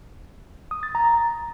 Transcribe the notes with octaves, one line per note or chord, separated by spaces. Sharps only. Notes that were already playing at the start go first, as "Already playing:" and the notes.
D#6
A6
A#5